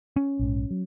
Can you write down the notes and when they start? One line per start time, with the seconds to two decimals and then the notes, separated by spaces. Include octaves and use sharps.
0.16 C#4
0.39 A#1 G#2
0.71 F#3